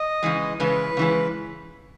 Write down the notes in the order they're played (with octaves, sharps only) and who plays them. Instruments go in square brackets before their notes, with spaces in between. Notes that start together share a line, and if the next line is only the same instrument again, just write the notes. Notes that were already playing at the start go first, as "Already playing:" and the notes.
Already playing: [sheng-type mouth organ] D#5
[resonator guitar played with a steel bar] C#3 E3 G#3
[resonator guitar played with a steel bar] C#3 E3 G#3 [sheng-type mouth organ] B4
[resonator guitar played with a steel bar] C#3 E3 G#3